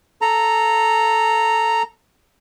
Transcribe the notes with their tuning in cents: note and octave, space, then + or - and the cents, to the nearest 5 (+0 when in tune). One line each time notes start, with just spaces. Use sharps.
A4 -5 A#5 -10